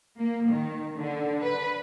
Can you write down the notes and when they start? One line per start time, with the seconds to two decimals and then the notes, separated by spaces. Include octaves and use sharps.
0.19 A#3
0.50 D#3
0.97 D3
1.42 B4